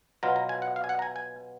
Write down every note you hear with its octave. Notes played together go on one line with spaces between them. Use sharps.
B2 F#3 B3 F4 A#5
A#5
G#5
F#5
F5
G#5
F#5
A#5
G#5
G#5